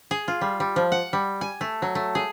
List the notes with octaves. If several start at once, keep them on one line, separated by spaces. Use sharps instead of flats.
G#4
F4
G3
G3
F3
F#5
G3
G#5
A3
F#3
A3
G#4